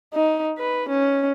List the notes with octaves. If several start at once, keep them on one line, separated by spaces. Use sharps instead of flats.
D#4
B4
C#4